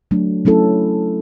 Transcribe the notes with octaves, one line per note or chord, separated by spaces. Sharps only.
F#3 A3 D4
F#3 A3 C#4 E4 A4